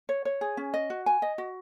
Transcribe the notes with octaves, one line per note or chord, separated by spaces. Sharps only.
C#5
C#5
G#4
C#4
D#5
F#4
G#5
D#5
F#4